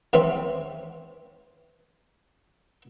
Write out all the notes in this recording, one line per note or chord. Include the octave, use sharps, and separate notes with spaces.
E2 E3 C4 C#4